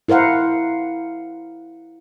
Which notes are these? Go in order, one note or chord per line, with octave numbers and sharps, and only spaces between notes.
E4 A#4 C5 F5 F#5